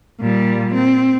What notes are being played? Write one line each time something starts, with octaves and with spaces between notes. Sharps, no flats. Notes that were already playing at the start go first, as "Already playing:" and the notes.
A#2 G3
C4